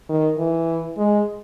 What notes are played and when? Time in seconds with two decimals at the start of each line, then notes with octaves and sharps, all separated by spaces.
0.09 D#3
0.38 E3
0.98 G#3